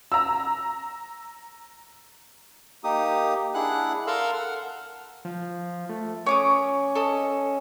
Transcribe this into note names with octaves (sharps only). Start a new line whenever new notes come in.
A#5 E6
A#3 D#4 G4 D#6
D4 E4 G#4 F#5 F#6
A4 A#4 F5 A#5 C6 E6
F#5 F6
F3
A3
C#4 C#5 D6 D#6
A4 D#5